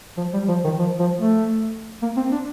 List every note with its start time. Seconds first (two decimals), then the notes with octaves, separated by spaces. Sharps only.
0.17 F3
0.33 G3
0.48 F3
0.64 D#3
0.79 F3
0.99 F3
1.20 A3
2.02 A#3
2.16 C4
2.32 D4